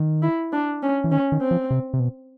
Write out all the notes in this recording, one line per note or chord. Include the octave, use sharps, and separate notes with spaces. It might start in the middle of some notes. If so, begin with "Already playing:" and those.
Already playing: D#3
E4
D4
C#4
E3
D#3 C#4
D#3
C4
F3
C3
C3
B2